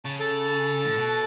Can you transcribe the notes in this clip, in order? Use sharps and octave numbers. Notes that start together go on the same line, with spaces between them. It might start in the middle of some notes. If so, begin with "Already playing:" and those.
C#3 A5
A4 A5
A2
B2